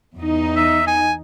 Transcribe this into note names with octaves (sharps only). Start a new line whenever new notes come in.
E2 D#4
E5
G#5